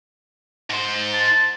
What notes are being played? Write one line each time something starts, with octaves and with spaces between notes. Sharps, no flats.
G#2 C5
A5